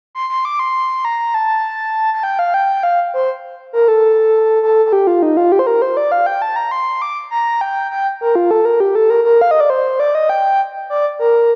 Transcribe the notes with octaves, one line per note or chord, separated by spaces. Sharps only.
C6
C6
D6
C6
A#5
A5
A5
G5
F5
G5
F5
C5
A#4
A4
A4
A4
G4
F4
D#4
F4
G4
C5
A#4
C5
D5
F5
G5
A5
A#5
C6
D6
A#5
G5
G5
A#4
F4
A4
A#4
G4
A4
A#4
A#4
F5
D#5
D5
C5
D5
D#5
G5
D5
A#4